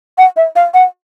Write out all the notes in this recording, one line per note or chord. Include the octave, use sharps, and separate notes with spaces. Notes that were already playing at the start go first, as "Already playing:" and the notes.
F#5
E5
F5
F#5